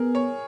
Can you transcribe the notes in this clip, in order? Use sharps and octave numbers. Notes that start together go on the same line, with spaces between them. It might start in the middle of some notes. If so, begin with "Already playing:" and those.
Already playing: B3 G#4 A#4
C#5